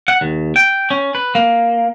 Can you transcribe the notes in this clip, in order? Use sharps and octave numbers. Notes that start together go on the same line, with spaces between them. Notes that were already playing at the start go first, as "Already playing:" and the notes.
F#5
D#2
G5
C#4
B4
A#3